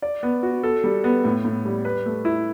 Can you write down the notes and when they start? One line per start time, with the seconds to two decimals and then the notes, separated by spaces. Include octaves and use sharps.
0.02 D5
0.23 B3
0.43 F#4
0.63 A4
0.84 G3
1.04 B3
1.25 A2
1.45 A2
1.65 G3
1.85 B4
2.06 A3
2.25 E4